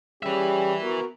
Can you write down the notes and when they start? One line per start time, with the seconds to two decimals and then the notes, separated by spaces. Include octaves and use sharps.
0.23 G3 C#4 G4 G#4 B4 E5
0.82 B3 F#4 A#4